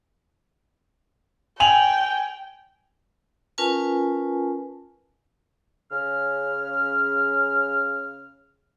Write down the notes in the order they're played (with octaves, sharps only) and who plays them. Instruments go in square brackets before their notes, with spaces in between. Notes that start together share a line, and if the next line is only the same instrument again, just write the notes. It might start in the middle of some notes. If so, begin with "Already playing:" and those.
[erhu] G5 [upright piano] G#5 F7 F#7
[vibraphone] C#4 F4 A#4 B4 G#5 A5
[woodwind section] C#3 F6